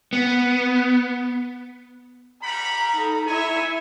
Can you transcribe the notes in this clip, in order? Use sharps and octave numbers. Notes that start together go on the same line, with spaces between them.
B3
G3 F#5 A#5 B5
D#4 A4
E4 C#5 E5 G#5